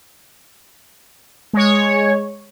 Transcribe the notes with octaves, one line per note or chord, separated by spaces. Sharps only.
G#3 C#5